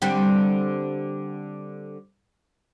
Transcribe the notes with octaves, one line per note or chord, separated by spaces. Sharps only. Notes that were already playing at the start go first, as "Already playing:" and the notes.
D3 G3 C4